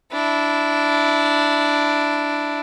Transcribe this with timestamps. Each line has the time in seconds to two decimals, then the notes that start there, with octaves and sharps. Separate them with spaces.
0.12 D4 E4